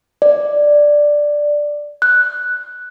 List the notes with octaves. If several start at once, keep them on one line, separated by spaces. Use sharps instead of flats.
D5
F#6